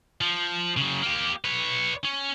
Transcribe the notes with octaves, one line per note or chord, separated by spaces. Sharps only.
F3
C#3 F#3
A#3 G4
B4 C#5
C#4